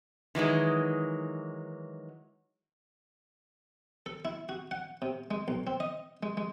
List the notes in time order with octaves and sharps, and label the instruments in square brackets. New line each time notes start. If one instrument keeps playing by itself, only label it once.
[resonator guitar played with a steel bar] D#3 E3 F#3 G#3
[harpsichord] A4
E4
F#4
F#5
C3
G#3
B1
C4
D#5
G#3
G#3